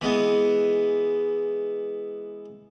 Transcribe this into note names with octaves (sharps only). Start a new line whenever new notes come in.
E3 G#3 B3